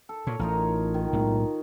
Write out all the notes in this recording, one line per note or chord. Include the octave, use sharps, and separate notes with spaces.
A4
A#2 C#5
A1 D#4 F4 A#4
D#3
B1 A2 G#3